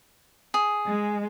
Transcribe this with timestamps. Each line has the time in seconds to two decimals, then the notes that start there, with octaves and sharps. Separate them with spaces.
0.54 G#4
0.86 G#3